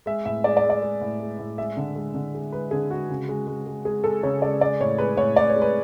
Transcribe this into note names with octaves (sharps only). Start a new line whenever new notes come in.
G#3 E5
A2 E5
G#3 D5
D5
G#3
D5
G#3
A2
G#3
A2
G#3 E5
D3
G#3
D3
G#3
G#3 B4
D3 G#4
G#3 F#4
C#3
G#3
G#3
G#3
G#3 G#4
G#3 A4
C#3 C#5
G#3 D5
G#3 D5
A2 C#5
G#3 B4
A2 C#5
A2 D5
C#5
G#3
B4